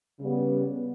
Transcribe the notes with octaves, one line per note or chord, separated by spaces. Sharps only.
C#3 G3 B3
B3